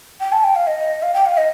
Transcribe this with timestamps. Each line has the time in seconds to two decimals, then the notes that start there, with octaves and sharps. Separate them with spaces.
0.20 G5
0.32 A5
0.44 G5
0.55 F5
0.67 D#5
1.02 F5
1.13 G5
1.25 F5
1.37 D#5